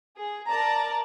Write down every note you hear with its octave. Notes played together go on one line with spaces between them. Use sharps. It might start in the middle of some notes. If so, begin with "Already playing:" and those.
G#4
A#4 D5 A5 A#5